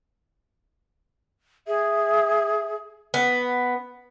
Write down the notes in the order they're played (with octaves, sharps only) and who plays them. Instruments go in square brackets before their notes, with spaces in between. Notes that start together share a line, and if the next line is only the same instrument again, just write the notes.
[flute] G#4 [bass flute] E5
[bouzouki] B3